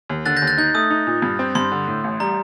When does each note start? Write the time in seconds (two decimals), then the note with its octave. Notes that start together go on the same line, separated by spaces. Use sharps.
0.09 D#2
0.26 D3 F#6 A6
0.37 G6 A#6
0.42 D#2
0.47 F#6 A6
0.58 D#4 G6
0.74 A3 D#6
0.90 D#4
1.07 A#2
1.22 G2
1.39 C4
1.55 G2 C6
1.72 D3
1.87 A2
2.04 A1
2.20 G3 A#5